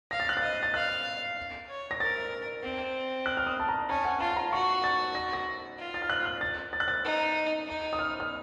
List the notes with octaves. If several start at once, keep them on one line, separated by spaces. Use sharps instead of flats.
F5 A#6
A6
F#6
A6
D#5
A6
F5 F#6
C#5
A#6
A#4 A6
C4
F#6
F6
D#6
A5
A#5
C#4 A5
F#5
F4 A5
A5
A#5
F#4 C#6
A6
A#6
A#6
F4
A6
F6
F#6
F#6
A6
A6
F#6
A6
D#4
D#4
D#6
F6
F6